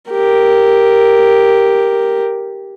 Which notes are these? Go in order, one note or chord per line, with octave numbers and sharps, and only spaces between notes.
G4 A#4